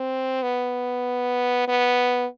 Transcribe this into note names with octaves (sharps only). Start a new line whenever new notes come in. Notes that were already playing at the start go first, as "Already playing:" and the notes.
Already playing: C4
B3
B3